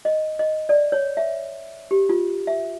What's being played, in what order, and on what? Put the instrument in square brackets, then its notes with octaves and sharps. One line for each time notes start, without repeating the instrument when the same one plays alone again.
[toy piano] D#5
D#5
D5
C#5
E5
G4
F4
E5